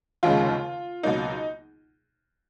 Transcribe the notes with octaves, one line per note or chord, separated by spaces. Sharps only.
F1 D#2 C#3 G#3 F4
C#2 B2 F#3 A#3 D#4